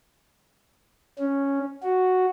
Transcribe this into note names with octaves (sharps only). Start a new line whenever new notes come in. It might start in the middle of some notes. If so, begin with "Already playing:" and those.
C#4
F#4